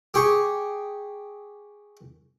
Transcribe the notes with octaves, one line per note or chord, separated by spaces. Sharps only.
G4 G#4 C#6